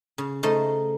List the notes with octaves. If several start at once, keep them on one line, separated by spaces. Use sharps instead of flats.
C#3
C#3 A3 D#4 C5 D#5